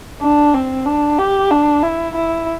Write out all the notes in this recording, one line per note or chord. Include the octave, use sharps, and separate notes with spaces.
D4
C4
D4
G4
D4
E4
E4